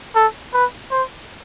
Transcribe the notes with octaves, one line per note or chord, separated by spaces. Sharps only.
A4
B4
C5